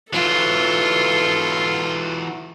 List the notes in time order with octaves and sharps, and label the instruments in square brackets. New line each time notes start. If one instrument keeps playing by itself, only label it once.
[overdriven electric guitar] E3 F#3 [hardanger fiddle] F4 [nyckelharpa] A4